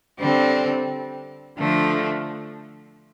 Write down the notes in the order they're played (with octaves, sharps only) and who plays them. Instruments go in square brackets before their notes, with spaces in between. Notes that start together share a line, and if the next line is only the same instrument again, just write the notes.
[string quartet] D3 G3 C4
D3 F3 A3